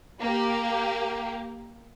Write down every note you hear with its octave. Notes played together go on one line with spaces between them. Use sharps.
A#3 G4